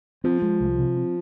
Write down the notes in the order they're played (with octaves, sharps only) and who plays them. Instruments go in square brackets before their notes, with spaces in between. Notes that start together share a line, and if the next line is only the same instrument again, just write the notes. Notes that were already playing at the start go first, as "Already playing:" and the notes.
[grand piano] F3 [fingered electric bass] C4
[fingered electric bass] G#3
C2
C3
C4